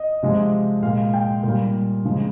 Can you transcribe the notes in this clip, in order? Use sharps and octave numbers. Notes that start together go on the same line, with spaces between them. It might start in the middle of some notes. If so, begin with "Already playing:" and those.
Already playing: D#5
C3 F3 G#3
A#2 G#3 F5
G5
A#2 G3
C#3 F3 G#3